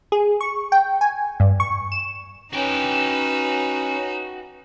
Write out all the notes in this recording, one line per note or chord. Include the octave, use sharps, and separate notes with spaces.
G#4
C#6
G5
G#5
G2
C#6
E7
C#4 D#4 F#4 B4 G5